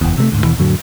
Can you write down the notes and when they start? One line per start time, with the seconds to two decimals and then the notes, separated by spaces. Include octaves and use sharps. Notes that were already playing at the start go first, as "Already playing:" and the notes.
0.01 F#1 E2
0.18 C3 G#3 A3
0.32 D2 G#2
0.44 D#2 B2 E3
0.58 F2 A2 D3 F#3